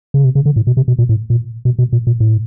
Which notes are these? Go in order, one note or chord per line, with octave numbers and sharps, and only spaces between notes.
C#3
C3
C#3
D3
A2
B2
C3
B2
A#2
A2
A#2
B2
B2
A#2
A#2
A2